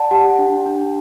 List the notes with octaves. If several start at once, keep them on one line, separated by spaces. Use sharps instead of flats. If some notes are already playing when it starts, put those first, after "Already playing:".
Already playing: D5 F#5 A5
G4 F#5 A5
D4
D4